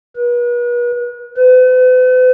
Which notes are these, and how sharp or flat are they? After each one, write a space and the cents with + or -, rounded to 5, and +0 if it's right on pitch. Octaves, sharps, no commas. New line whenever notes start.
B4 -40
B4 +45